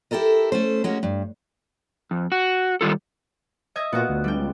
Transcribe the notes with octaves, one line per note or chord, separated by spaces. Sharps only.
E4 G4 A4 A#4 D#5
A3 C#4 C5
G#3 A#3 C#4 F#4
G2
F2
F#4
D#3 G3 F4 A4
D#5 E5 G#6
A#2 B3 F4 F#4
D2
G3 G5
C#2